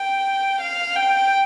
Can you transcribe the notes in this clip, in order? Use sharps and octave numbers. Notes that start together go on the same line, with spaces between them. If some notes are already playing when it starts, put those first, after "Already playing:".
Already playing: G5
F5
G5